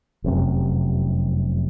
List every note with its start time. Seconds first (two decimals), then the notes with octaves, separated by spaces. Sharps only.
0.24 F1 F#2 C3